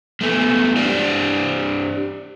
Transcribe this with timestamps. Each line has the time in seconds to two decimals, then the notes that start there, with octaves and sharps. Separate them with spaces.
0.21 G#3 A3 B3
0.76 D4 G4 C5 D5